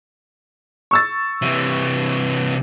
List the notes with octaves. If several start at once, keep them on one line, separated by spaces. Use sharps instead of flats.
C#6 E6 A6
C3 E3